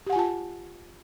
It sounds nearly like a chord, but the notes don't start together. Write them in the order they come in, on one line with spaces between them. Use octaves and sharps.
G4 F#5 G#5 F4 A5